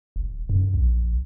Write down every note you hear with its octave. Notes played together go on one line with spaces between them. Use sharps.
D1
F#2
A#1